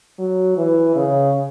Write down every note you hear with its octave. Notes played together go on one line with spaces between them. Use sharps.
F#3
E3
C#3